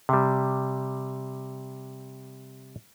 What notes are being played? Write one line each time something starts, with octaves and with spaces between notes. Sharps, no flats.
C3 G3